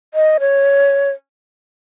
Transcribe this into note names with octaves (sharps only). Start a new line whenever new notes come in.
D#5
C#5